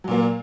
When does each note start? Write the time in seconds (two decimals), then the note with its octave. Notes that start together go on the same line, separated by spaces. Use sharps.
0.04 F#3
0.08 A#2
0.11 A#3